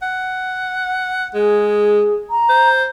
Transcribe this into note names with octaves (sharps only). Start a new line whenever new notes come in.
F#5
G#3 G#4
A#5
C5